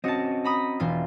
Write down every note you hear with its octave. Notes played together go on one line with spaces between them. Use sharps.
C4 C#4 F#4 D#5 A5
A#5 B5 D#6
E1 F4